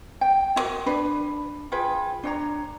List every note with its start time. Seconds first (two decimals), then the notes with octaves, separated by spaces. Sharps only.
0.21 G5
0.56 E4 F#4 A#4
0.86 D4 B4 B5
1.72 F4 G#4 B4 G5
2.23 D4 C#5 A#5